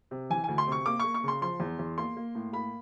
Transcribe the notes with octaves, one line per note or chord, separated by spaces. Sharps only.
C3
E3 G#5
D2 G#5
C6
C3 C#6
A#3 D6
A#3 C#6
C#6
C#3 C6
F3 C6
E2
E2
A#3 C6
A#3
A2
A#3 B5